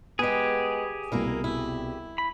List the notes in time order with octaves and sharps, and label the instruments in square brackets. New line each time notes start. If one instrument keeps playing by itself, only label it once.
[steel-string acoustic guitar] G#3 B3 [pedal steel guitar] G4 G#4
[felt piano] C2 B2 [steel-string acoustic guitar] A#3 E4 A#4
[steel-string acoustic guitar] E4
[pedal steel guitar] B5